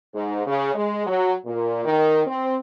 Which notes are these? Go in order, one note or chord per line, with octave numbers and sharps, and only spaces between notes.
G#2
C#3
G#3
F#3
A#2
D#3
C4